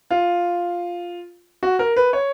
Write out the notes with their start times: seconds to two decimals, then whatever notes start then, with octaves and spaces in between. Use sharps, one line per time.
0.11 F4
1.63 F#4
1.79 A#4
1.96 B4
2.13 C#5